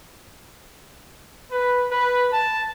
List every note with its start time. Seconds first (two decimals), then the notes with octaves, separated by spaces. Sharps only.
1.51 B4
1.91 B4
2.32 A5